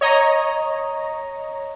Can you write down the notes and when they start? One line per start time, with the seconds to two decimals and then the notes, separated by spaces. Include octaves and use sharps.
0.01 C#5 D#5 A#5